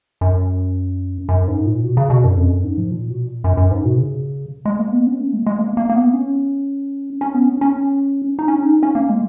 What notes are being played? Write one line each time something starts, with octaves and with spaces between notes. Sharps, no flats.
F#2
F#2
G#2
A#2
B2
C#3
B2
F#2
F2
F#2
G#2
F3
A#2
B2
A#2
F#2
F#2
G#2
B2
C#3
G#3
A#3
B3
C#4
A#3
G#3
G#3
A#3
A#3
A#3
B3
C#4
C#4
B3
C#4
C#4
D#4
C#4
D#4
C#4
A#3
G#3